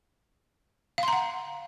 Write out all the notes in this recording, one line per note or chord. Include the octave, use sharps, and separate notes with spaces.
F5 F#5 A#5 C6